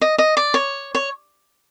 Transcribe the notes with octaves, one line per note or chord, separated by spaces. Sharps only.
D#5
D#5
D5
C#5
C#5